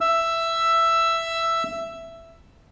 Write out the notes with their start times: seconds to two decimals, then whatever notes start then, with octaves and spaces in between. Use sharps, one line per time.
0.01 E5 E6